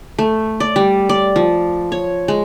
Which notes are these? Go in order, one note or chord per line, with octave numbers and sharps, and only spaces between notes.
A3
D5
G3
D5
F3
C#5
G#3